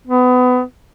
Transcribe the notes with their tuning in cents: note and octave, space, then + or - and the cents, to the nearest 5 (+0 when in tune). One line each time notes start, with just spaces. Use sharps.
B3 +25